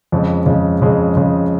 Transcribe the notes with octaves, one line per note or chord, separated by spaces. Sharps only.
F2 C#3 G#3
F2 C#3 G#3
F2 C#3 G#3
F2 C#3 G#3